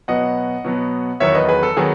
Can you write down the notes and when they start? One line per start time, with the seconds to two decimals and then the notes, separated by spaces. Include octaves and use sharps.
0.08 B2 F#3 B3 D#5 F#5
0.65 B2 F#3 B3
1.20 E2 D#3 F#3 B3 C#5 E5
1.35 B4 D#5
1.48 G#4 B4
1.63 A4
1.77 D#3 F#3 B3 G#4